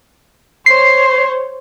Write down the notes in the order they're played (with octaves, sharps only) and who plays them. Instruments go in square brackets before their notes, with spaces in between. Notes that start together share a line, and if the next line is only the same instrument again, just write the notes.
[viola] C5 C#5 [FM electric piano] C7